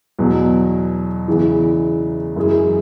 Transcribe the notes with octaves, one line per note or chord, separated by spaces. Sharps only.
E2 B2 F#3
E2 C#3 E3
F#2 E3 G#3 E4 G#4